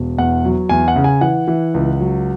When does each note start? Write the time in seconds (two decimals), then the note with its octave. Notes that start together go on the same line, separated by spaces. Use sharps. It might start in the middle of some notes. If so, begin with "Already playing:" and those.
Already playing: E1
0.18 E2 F#5
0.45 F#3
0.69 E2 G#5
0.88 F#5
0.96 C#3
1.04 G#5
1.21 E3 F#5
1.48 E3
1.74 C#2
2.00 F#3